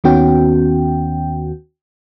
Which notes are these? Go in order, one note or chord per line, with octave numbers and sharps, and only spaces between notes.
D#2 D#3 B3 C#4 F#4 G5